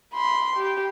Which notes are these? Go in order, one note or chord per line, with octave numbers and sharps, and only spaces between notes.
B5 C6
G4